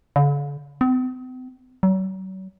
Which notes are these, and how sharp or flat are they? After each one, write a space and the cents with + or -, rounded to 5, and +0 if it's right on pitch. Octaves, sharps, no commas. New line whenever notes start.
D3 -45
C4 -45
F#3 +40